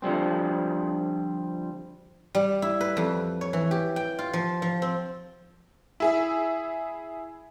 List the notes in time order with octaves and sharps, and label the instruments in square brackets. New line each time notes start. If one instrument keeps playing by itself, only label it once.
[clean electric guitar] D3 F3 G3 C4
[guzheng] G3
E4
B4
F2
C#5
E3
G4
G5
F4
F3
F3
C4
[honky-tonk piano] E4 G#4 E5